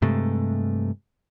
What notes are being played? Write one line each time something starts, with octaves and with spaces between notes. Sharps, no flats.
G2 C3 G#3 A3